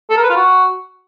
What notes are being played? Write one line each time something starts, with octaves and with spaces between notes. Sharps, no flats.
A4
A#4
B4
F4
F#4